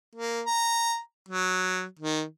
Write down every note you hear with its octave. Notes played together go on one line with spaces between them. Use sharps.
A#3
A#5
F#3
D#3